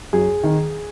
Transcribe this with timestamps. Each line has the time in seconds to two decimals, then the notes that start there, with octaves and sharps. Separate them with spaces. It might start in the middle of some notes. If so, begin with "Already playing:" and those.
0.13 F#2 G#4
0.44 D#3